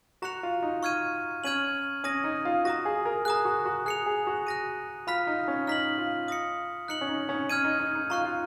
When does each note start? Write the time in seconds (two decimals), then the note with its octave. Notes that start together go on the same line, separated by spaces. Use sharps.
0.22 F#4 A#5 C#6 F#6 C#7 F7
0.43 F4
0.62 D#4
0.83 C#6 F6 G#6 D#7
1.44 C#4 F6 G#6 D#7 F#7
2.04 C#4 D#6 A#6 D#7
2.24 D#4
2.45 F4
2.65 F#4 A#5 D#6 A#6
2.85 G#4
3.05 A#4
3.25 G#4 A#5 D#6 F#6
3.45 F#4
3.66 F#4
3.86 G#4 F#6 C#7 F7
4.06 G#4
4.27 F#4
4.47 F#6 A#6 D#7
5.07 F4 B5 F6 B6
5.27 D#4
5.48 C#4
5.67 D#4 F6 B6 F#7
5.98 F4
6.28 D#6 A#6 C#7
6.88 D#4 F#6 C#7 F#7
7.01 C#4
7.09 D#4
7.29 C#4
7.50 C#4 F6 G#6 D#7
7.64 D#4
7.79 D#4
7.95 D#4
8.10 F4 A#5 C#6 F#6
8.25 F4